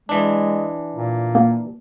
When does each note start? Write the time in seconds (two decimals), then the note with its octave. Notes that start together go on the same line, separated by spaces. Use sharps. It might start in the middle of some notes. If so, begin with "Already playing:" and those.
0.09 E3 G#3 D4
0.96 A#2
1.35 A#3